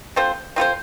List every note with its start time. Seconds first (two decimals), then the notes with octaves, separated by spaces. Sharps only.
0.16 C4 F4 A4 C5
0.56 C4 F4 A4 C5